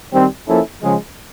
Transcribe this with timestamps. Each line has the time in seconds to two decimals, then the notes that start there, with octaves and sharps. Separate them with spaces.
0.13 D#3 G3 C4
0.48 F3 A#3 C#4 E4 A4
0.83 C#3 F3 G#3